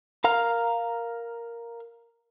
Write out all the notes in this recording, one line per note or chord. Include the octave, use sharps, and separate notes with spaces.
A#4 F5 A#5 F6